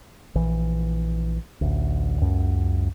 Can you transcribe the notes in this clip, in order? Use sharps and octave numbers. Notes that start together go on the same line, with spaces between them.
A#1 E3
A1 D2
C#2 F#2